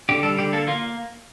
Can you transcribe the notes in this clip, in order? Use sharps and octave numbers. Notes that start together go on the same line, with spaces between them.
D3 G4
G3 A4
D3 G4
A#3 A4
A#3 F4